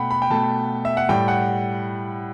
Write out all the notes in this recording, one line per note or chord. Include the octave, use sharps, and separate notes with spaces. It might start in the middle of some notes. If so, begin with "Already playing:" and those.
Already playing: B2 A3 F#5 G5 B5
B5
G5
B2 A3 A5
E5
F#5
A2 G3 G5
F#5